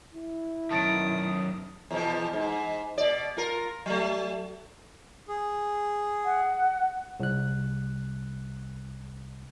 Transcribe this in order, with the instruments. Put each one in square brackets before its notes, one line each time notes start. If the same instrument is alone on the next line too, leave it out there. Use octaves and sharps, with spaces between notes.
[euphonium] E4
[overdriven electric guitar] F#2 D#3 [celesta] A5 A6 D7 [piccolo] D#6
[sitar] E2 B2 F3
G#2
B2 D5
F4 A#4
F#3 A3
[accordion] G#4
[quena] F#5
[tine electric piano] C2 F#6